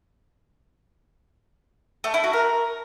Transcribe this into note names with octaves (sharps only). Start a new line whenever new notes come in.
A3
E4
F#4
A#4